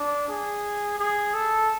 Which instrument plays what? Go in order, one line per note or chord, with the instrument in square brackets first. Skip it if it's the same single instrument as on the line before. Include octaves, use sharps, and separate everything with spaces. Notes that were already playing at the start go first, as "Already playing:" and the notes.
Already playing: [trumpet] D4
G#4
G#4
A4